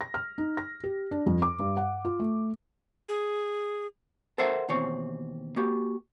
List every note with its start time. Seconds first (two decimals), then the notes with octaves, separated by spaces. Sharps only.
0.01 A#6
0.14 F6
0.38 D#4
0.57 A#6
0.84 G4
1.11 D4
1.26 F2
1.42 D6
1.59 G2
1.77 F#5
2.05 F4
2.20 A3
3.09 G#4
4.38 A4 A#4 C5 E5 F#5
4.68 D#2 B2 E3 C4 C#5
5.56 A#3 F#4 G4